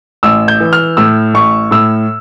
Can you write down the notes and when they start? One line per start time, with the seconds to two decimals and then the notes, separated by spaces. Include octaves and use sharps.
0.23 A1 E6
0.48 G6
0.60 E3
0.73 F6
0.97 A2 E6
1.34 A1 C#6
1.71 A2 E6